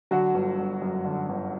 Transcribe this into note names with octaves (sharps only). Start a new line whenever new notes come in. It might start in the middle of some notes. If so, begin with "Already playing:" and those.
D3 F#3 F#4
G1
G1
F#2
D3
G1